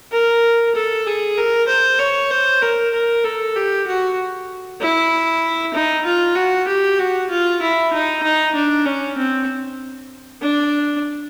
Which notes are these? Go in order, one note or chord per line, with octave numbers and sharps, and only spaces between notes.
A#4
A4
G#4
A#4
C5
C#5
C5
A#4
A#4
A4
G4
F#4
E4
D#4
F4
F#4
G4
F#4
F4
E4
D#4
D#4
D4
C#4
C4
D4